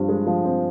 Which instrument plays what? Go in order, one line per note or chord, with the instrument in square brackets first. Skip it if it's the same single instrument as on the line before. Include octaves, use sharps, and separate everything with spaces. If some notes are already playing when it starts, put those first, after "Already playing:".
Already playing: [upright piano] G2 F3 C4
G#3
F3
C4